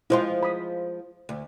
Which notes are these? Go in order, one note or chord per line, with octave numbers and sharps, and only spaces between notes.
F3 G#3 E4 F4 C5 C6
B5 D#6
D2